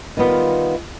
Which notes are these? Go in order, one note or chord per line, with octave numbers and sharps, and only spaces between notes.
D#3 G3 B3 F4